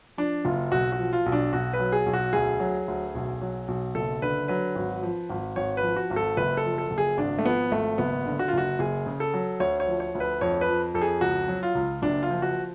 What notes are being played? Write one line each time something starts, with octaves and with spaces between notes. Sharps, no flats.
F3 D4
F#1 F4
B1 F#4
F#4
F3
F4
B1
D4
B1 F#4
B4
F#3
G#4
B1
F#4
D2 G#4
F#3
D2
B1
F#3
B1
F#1 A4
D3 B4
F#3 B4
G#1
F3
G#1
G#1 C#5
B4
F3
F#4
G#1
A4
F#1 B4
A4
F3
A4
F#1
G#4
G#1 D4
A3
F3 B3
G#1 A3
F#1 B3
D3
F#4
F4
F#1 F#4
F#1 G#4
C#3
A4
F#3
D2 C#5
C#5
F3
C#5
D2
B4
F2 C#5
B4
F3
F2 A4
G#4
C#2 F#4
F#3
F4
C#2
F#1 D4
F4
F3
F#4